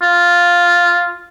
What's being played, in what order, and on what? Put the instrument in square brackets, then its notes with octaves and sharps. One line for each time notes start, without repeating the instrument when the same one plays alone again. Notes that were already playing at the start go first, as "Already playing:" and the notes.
[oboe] F4